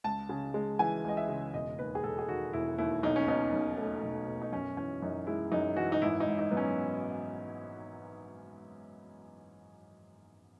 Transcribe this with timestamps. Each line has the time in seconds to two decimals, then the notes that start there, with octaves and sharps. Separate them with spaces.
0.04 C#2 A5
0.29 C#3
0.54 G#3
0.79 E3 G#5
1.04 C#2 D#5
1.17 E5
1.29 C#3
1.54 E1 D#5
1.79 D#2 B4
1.95 G#4
2.04 E1 A4
2.19 G#4
2.29 D#3 F#4
2.53 E1 E4
2.78 D#2 E4
3.03 B1 D#4
3.16 C#4
3.27 B2 D#4
3.53 B1
3.78 A3
4.03 B1
4.27 B2
4.42 D#4
4.52 F#2 C#4
4.77 E3 C#4
5.02 F#2 D#4
5.27 G#3 E4
5.52 F#2 D#4
5.76 E3 F#4
5.92 D#4
6.02 G#1 E4
6.20 D#4
6.26 G#2
6.39 D#4
6.51 F#3 B3
6.57 C#4